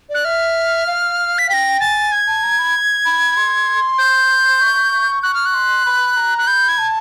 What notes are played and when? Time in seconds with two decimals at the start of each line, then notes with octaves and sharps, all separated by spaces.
0.09 D5
0.14 F#6
0.25 E5 F6
0.87 F5
1.38 B6
1.49 G5 B6
1.53 A#6
1.80 G#5 A6
2.12 G#6
2.27 A5
2.43 A#5
2.59 B5
3.05 B5
3.37 C6
3.98 G6
4.61 C#6
5.23 C#6 F#6
5.34 F6
5.46 F#6
5.54 C6
5.86 B5
6.17 A#5
6.38 F#6
6.47 B5 G6
6.69 G#6
6.78 A5